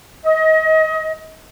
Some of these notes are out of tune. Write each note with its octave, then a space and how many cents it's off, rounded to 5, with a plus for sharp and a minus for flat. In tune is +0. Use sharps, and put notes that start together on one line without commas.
D#5 +30